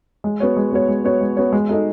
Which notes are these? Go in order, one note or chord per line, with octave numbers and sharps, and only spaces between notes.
G#3
B3 F#4 C#5
G#3
B3 F#4 C#5
G#3
B3 F#4 C#5
G#3
B3 F#4 C#5
G#3
D#4 F#4 A4 D#5